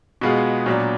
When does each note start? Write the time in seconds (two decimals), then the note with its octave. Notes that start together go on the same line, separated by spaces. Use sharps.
0.21 B2 G#3 B3 F4 G#4
0.66 A#2 F#3 B3 D4